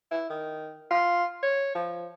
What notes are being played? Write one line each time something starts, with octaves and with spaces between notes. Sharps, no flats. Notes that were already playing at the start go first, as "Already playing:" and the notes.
E4
D#3
F4
C#5
F3